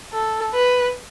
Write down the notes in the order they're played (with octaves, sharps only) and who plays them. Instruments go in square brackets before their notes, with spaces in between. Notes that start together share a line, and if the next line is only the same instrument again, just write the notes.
[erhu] A4
B4